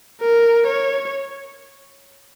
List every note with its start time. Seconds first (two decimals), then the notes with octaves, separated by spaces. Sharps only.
0.21 A#4
0.67 C#5